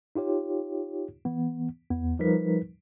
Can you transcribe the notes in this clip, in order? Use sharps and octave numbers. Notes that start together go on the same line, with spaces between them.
D#4 F4 G4 C#5
E3 B3
E2 B3
F3 G3 D#4 A#4 B4 B6